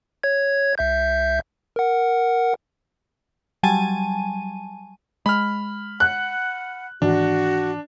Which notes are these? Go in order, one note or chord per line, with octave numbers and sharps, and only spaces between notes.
C#5 G#6
C2 E5 G6
A#4 F#5
F#3 G3 G#5 A5 D#7
G#3 B5 F6
F#5 F#6
G#2 D#3 E3 D4 F#4